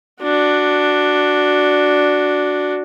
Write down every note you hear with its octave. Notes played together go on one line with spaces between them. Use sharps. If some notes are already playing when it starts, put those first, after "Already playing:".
D4 F#4